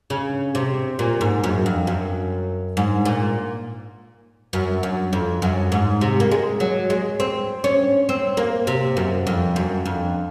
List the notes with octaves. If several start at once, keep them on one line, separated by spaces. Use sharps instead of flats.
C#3
C3
A#2
G#2
F#2
F2
F#2
G#2
A#2
F#2
F#2
F2
F#2
G#2
C3
A#3
G#3
F#3
G#3
C4
C#4
C4
A#3
C3
F#2
F2
F#2
F2